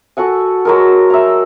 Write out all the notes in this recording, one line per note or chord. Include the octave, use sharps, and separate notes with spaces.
F#4 A4 F#5 G#5
F#3 G#3 A#4
E5 A#5